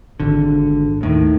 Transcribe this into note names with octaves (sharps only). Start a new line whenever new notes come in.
G#1 D3
D#2 A2 D#3